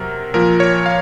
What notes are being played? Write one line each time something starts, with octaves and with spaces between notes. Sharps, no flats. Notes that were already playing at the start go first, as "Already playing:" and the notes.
Already playing: C3 F#3 A#4
A#2 F3 A#4
C#5
F5